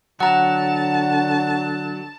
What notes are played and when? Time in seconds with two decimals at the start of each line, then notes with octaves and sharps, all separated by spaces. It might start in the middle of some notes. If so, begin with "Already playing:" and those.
0.20 D3 F#3 F#5 A5 A#5